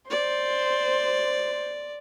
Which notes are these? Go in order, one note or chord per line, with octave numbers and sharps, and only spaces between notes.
C5 D5